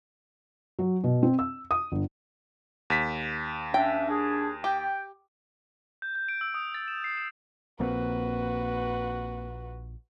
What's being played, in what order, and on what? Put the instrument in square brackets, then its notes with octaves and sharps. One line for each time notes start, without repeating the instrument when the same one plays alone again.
[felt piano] F#3
B2
C4
E6
D#6
G1
[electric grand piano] D#2 B6
[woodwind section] C#4 D4 E5 [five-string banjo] G5
[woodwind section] D4 G#4
[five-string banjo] G4 [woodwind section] G5
[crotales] G6
G6
D7
E6
D#6
A6
E7
C7
E7
[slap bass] A#1 A#2 [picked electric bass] A#3 C4 [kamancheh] F#4 B4